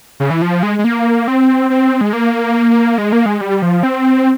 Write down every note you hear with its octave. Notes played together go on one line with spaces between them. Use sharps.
C#3
E3
F3
G#3
G#3
A#3
C4
C4
G#3
A#3
G#3
A#3
G#3
G3
F3
C4